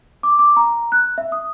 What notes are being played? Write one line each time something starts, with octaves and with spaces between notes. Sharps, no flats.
D6
D6
A#5
F#6
E5
D#6